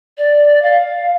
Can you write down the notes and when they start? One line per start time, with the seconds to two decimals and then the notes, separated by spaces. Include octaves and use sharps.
0.18 D5
0.62 F5